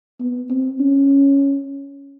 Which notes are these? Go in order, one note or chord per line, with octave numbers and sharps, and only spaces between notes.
B3
C4
C#4